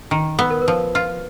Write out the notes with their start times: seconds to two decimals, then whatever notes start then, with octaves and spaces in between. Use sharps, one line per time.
0.11 D#3
0.39 B3 B4
0.51 A#4
0.62 B4
0.68 F3
0.95 F4